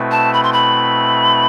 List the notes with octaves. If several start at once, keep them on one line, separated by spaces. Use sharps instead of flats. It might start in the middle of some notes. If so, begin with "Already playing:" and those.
Already playing: B2 A3 C4 E4 B4
A5
B5
C6
B5